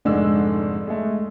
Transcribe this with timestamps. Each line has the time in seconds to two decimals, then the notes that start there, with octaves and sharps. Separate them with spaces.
0.05 F1 G#2 D3 G#3 D5 E6
0.87 G#3 A3